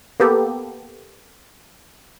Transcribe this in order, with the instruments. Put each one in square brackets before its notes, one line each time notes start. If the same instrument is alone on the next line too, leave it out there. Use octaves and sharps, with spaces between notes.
[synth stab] A#3 B3 G4 A4